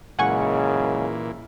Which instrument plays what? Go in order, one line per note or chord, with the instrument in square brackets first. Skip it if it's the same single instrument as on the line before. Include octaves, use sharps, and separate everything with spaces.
[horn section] F#2 C#3 G#3 [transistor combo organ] A#2 E3 [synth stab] F#5 G#5 C#6